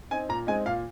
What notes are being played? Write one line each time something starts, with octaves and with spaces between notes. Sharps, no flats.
C4 D#4 G#5
A#2 A#5
G#3 C4 D#4 G#5
A#2 F5